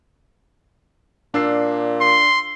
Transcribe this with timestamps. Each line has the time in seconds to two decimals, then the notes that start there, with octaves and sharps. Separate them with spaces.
1.34 A#2 D4 E6 C7
2.01 C6